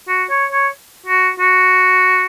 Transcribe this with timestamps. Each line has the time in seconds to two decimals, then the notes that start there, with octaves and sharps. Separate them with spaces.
0.08 F#4
0.30 C#5
0.52 C#5
1.06 F#4
1.40 F#4